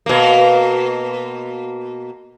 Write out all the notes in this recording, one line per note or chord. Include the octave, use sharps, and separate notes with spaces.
B2 A#3